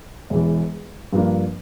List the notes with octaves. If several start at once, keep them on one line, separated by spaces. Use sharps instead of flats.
E1 E2 E3
G2 F3 A#3 D4